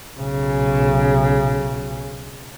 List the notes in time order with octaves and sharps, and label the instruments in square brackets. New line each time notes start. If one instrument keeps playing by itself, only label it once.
[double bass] B1 C#3